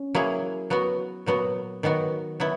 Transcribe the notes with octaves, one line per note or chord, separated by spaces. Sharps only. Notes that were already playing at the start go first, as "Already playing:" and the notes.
Already playing: C#4
F#3 A#3 E4 G#4
F#3 B3 F#4
A#2 F#3 B3 F#4
D#3 F#3 B3 F#4
F#3 B3 E4